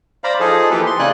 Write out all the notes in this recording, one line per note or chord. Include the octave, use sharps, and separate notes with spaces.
C5 D5 F5 A#5 B5
F3 D#4 G#4 A4
E3 F3 A#3 G4 A4 B4
C6
C#3 A#3 D#4 D5 G#5 F#6